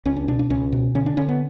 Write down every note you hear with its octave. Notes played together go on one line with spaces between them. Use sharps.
C#2 C#4
D4
B2 D4
D4
C#2 C#4
B2
D3 C#4
D4
D3 C#4
B3